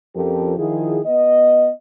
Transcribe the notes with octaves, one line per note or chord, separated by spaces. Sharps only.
F2 F3 C#4 G4 A4 A#4
D#3 F3 E4 F4 G#4
B3 D#5